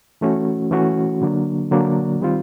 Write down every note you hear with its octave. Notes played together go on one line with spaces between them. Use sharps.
E3 A3 C#4 F#4
E3 A3 C#4 F#4
D3 F#3 A#3 D4
D3 F#3 A#3 D4
D#3 G3 C4 F4